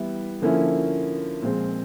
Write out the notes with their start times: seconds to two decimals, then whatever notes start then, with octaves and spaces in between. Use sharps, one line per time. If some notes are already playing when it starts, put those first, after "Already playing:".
Already playing: E3 G3 B3 E4
0.42 D3 F3 A#3 C#4 E4
1.42 A#2 F3 G#3 C4